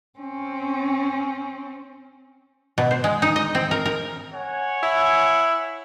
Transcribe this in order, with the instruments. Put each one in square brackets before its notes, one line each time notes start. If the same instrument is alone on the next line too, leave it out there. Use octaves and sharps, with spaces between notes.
[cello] C4 C#4
[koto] B2
C5
G#3
D#4
D#5
C4
A#4
A#4
[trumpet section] C#5 F#5 G#5
[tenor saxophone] E4